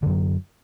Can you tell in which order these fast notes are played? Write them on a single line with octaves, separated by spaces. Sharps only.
D3 F#2 F#3